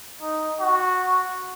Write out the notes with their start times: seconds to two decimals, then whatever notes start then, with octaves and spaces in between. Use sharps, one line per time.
0.21 D#4
0.60 F#4